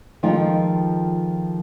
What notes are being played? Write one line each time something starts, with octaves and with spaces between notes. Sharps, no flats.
D#3 F3 G#3 F4 A4 G5